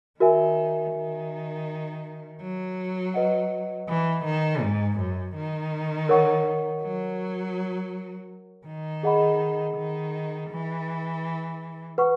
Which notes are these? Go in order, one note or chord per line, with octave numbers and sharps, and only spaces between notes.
D#3 F#4 A#4 E5 G#5
D#3
F#3
B4 D#5 F#5
E3
D#3
G#2
F#2
D#3
A#4 C#5 F#5 C#6
F#3
D#3
G#4 D#5 F#5 B5
D#3
E3
B4 F#5 C#6